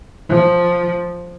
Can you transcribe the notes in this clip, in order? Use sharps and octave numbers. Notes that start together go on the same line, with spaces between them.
F3